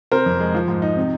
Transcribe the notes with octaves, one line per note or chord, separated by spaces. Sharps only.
C3 A#4 C5
F2
G#3
F3
G#2
D#4
C3